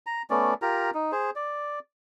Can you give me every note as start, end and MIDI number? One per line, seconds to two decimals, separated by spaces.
0.06 0.22 82
0.30 0.54 57
0.30 0.54 59
0.30 0.54 61
0.30 0.54 74
0.62 0.91 65
0.62 0.91 67
0.62 0.91 70
0.62 0.91 82
0.94 1.11 63
1.12 1.30 68
1.12 1.30 72
1.36 1.79 74